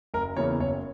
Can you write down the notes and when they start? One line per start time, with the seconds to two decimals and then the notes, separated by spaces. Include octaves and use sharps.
0.14 F#1 A#4
0.37 E2 C#3 E3 A#3 C#5
0.59 F#1 C#5